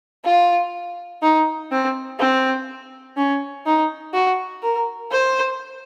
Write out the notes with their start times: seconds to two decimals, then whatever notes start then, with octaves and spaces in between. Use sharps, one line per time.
0.25 F4
1.22 D#4
1.72 C4
2.19 C4
3.17 C#4
3.66 D#4
4.14 F#4
4.63 A#4
5.11 C5